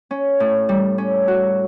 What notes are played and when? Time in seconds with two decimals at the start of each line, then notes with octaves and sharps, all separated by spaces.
0.11 C#4
0.40 A2
0.69 G3
0.98 C#4
1.28 F#4